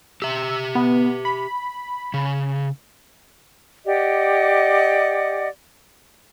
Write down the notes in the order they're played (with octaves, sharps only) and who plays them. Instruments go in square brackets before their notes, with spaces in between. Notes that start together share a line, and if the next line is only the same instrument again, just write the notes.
[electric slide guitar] G4 E5 [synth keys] E6
[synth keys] B3
B5
[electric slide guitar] C#3
[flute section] G4 D5 D#5 F#5